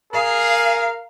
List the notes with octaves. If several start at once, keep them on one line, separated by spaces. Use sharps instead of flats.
G#4 A#4 F5